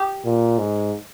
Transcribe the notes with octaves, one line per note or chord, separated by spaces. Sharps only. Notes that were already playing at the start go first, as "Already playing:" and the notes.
Already playing: G4
A#2
G#2